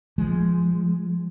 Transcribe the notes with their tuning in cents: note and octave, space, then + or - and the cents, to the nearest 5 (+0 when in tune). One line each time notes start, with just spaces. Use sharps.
F3 -10 G#3 +0